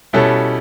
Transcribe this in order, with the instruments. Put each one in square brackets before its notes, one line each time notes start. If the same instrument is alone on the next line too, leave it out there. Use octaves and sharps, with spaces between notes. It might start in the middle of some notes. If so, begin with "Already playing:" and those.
[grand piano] B2 G3 C#4 E4 A4